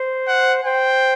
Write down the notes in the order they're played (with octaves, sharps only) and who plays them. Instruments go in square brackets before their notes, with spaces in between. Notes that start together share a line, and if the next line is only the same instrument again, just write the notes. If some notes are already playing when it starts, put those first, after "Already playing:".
Already playing: [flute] C5
[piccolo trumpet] F#5
[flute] C5 [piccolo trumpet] G5